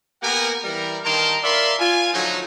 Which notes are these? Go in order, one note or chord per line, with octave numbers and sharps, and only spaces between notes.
A#3 B3 G4 A#4 F#5 G#5
E3 G3 A#4
G2 D#3 A#4 A5 A#5 C6
A#4 D5 E5 F5 B5 C6
F4 G#5
D3 F3 F#3 A3 D#4